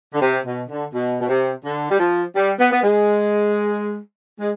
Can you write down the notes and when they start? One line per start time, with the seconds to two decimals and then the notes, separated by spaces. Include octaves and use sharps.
0.14 D3
0.22 C3
0.46 B2
0.69 D3
0.94 B2
1.21 B2
1.29 C3
1.65 D3
1.90 G3
2.00 F3
2.35 G3
2.60 B3
2.73 B3
2.83 G#3
4.40 G#3